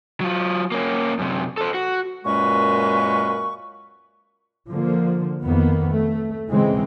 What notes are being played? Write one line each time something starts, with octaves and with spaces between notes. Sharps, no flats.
F#3 F4
A#3 C#4
F#2 C3
A4 C5
F#4
F#2 A#2 G#3 C#4 B4 C#6
D3 F3 A#3
F2 D#3 A#3 B3
A3
C#3 E3 G#3 C4